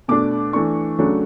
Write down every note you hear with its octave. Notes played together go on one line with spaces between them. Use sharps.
B2 A3 D4 D6
E3 A3 D4 C#6
C#3 F#3 A3 D4